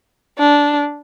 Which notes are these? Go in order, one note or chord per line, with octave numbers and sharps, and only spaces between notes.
D4